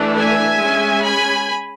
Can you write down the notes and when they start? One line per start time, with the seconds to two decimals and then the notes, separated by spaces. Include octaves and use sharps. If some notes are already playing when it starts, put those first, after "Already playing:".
Already playing: E3 A3 D4
0.16 E5 G#5
0.60 G#3 C#4
1.03 G#5 B5